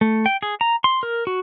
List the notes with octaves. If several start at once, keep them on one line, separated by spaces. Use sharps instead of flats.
A3
G5
G#4
A#5
C6
A#4
F#4